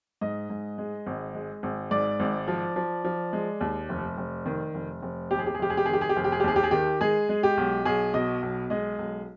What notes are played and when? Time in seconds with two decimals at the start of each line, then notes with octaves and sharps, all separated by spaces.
0.21 G#2 D#5
0.50 G#2
0.78 G#3
1.06 G#1
1.35 G#3
1.63 G#1
1.91 G#2 D5
2.20 G#1
2.48 F3
2.76 F3
3.05 F3
3.33 G#3
3.61 D#2
3.89 F1
4.17 F1
4.46 D#3
4.74 F1
5.02 F1
5.31 D#2 G4
5.39 G#4
5.46 G4
5.55 G#4
5.59 F1 G4
5.70 G#4
5.77 G4
5.86 D#3 G#4
5.93 G4
6.01 G#4
6.09 G4
6.16 F1 G#4
6.24 G4
6.32 G#4
6.40 G4
6.44 D#2 G#4
6.56 G4
6.63 G#4
6.71 D#3 G4
7.01 G#3 G#4
7.29 G#3
7.43 G4
7.57 B1
7.85 B1 G#4
8.14 B2 D#5
8.42 B1
8.70 G#3 D#5
8.99 B1